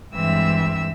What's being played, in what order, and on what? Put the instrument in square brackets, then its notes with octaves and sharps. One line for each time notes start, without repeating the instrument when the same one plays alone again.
[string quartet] G2 E3 G#3 C4 E5 E6